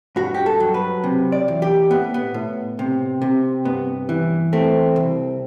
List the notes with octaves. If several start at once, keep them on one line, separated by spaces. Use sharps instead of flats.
G2 F#4
G4
A4
F#3
B4
C3
D5
E2
G4
A2 B3
B3
A2
C3
C3
G2 B3
E3
A3 C4
C2